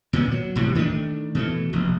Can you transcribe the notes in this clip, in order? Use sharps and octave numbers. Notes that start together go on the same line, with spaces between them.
A#2 D#3 B3
F#3
E1 A2 C3 G3
D#3 A3 A#3 D4
B2 E3 A3
F1 A#1